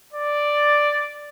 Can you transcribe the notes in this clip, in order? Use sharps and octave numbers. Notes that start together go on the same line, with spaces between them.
D5